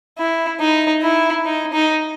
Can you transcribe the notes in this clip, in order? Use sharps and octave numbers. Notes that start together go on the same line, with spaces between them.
E4
D#4
E4
D#4
D#4